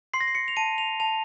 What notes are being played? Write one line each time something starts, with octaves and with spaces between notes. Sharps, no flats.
C6 C7
A#6
C7
C#7
F7
A5 D#7
F7
A5 F7